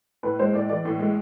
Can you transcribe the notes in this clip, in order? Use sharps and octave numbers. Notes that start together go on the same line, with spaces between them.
A2 B4
G#3 C5
A2 D5
E3 D5
A2
G#3